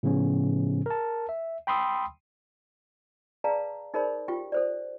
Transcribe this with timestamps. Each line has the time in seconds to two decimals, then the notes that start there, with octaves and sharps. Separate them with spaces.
0.03 A2 C#3 F3 B3 C#4
0.86 A#4 A5
1.29 E5
1.67 G5 B5 C6 D#6 E6
3.44 G#4 B4 D5 F5 A5 A#5
3.94 D#4 G#4 A#4 C5 D5 B5
4.28 F4 G4 G5
4.52 A4 C5 D5